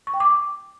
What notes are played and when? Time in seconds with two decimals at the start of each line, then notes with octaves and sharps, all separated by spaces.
0.07 C#6
0.14 G5
0.20 D6